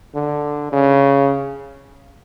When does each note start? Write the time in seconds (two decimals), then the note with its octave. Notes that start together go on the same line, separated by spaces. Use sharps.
0.15 D3
0.72 C#3